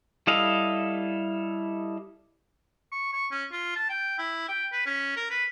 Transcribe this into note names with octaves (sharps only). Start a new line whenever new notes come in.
G3 E4 A4 D#5 F5
C#6
C#6
C#4
F4
A5
G5
E4
G5
B4
C#4
A#4
B4